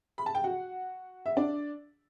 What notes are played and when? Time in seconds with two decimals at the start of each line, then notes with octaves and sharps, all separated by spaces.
0.18 B5
0.26 A5
0.35 G5
0.44 F#4 F#5
1.26 E5
1.37 D4 D5